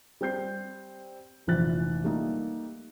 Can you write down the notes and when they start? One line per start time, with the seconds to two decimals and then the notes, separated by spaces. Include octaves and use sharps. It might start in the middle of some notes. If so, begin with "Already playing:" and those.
0.21 G3 C4 G6 C7
1.47 F1 A#1 E3 C5 F#6 A6
2.04 G3 A3 A#3 D#4